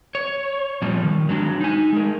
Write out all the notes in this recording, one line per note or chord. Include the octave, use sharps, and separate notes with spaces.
C#5
A#2 F3 G3
D#3
F#3 G#3 D4
D#4 G#5
G#3 A#4